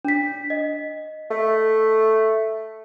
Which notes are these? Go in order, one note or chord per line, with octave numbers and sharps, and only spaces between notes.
D4 B6
D#5
A3